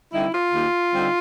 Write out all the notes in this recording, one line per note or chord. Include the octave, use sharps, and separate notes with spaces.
D3 G3 C4 D#4 E4
F4
D#2
D3 G3 C4 D#4